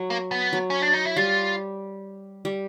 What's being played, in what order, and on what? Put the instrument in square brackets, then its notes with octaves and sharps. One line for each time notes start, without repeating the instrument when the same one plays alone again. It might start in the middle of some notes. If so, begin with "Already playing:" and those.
Already playing: [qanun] F#3
[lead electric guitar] A#3
B3
[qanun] F#3
[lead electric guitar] C#4
D4
D#4
E4
[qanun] G3 [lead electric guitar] F4
[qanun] G3